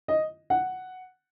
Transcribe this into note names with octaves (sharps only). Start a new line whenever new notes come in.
D#5
F#5